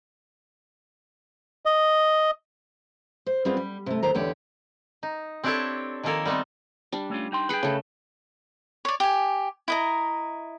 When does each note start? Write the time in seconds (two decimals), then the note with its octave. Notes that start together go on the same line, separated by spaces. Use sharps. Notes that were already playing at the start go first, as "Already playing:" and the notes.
1.66 D#5
3.26 C5
3.45 G3 B3 C4 F4 G#4
3.57 G3
3.86 C3 A3
4.03 D#2 D#3 C5 A#5
4.15 E2 D3 G4 C#5 D5
5.03 D#4
5.44 C4 D4 E4 G4 A4 C#5
6.04 D#3 F3 A#3 A4 A#4 G#5
6.25 G3 B3 C4 D#4 E5
6.92 G3 D4
7.10 A3 C#4 F4
7.32 D#4 G5 C6
7.49 G#4 B4 G5 B5
7.63 C#3 A3
8.85 C#5 D5
9.00 G4 G#5
9.68 E4 D#5 A#5